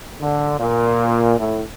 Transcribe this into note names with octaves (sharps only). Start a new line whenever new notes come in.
D3
A#2
A2